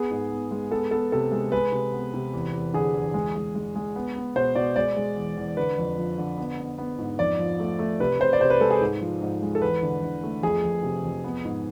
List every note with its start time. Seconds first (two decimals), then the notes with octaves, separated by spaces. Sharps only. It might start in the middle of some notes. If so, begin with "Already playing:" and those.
Already playing: B3 G#4
0.11 G#2
0.32 B3
0.51 G#3
0.71 B3 A4
0.91 B3 A4
1.12 C3 A4
1.32 G#3
1.52 G#3 B4
1.72 C3
1.93 B3
2.14 C3
2.33 E2
2.54 E2
2.73 D3 G#4
2.94 E2
3.14 G#3
3.35 G#3
3.55 G#3
3.75 G#3
3.96 B3
4.16 B3
4.36 B2 C5
4.55 B2 D5
4.76 G#3 D5
4.96 G#3
5.16 E2
5.37 E2
5.57 D3 B4
5.78 F2
5.98 F3
6.18 D3
6.38 B3
6.59 B3
6.78 B3
6.98 G#2
7.19 F2 D5
7.39 F3
7.60 A3
7.79 A3
8.00 C3 B4
8.20 C3 C5
8.33 D5
8.40 C3 C5
8.50 B4
8.60 G#3 A4
8.70 G#4
8.81 G#2
9.01 F3
9.22 G#2
9.42 G#3
9.55 A4
9.62 E2 B4
9.83 D3
10.03 D3
10.23 A3
10.42 F2 G#4
10.63 F2
10.83 C3
11.04 F2
11.24 B3
11.45 G#2